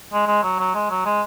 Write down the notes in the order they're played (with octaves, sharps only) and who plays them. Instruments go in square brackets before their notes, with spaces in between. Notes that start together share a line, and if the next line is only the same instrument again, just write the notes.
[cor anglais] G#3
G#3
F#3
F#3
G#3
F#3
G#3